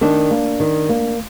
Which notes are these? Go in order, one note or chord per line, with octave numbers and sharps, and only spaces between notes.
D#3 D4
A#3
D#3
A#3